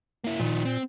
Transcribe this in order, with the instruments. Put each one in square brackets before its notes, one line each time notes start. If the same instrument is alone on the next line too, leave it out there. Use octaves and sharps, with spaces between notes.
[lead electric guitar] A#3 E4
[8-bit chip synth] A#2 [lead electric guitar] D#3 F3
[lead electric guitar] C4